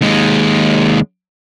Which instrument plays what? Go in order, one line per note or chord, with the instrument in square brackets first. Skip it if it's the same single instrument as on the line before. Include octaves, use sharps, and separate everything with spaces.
[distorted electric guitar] D#2 G#3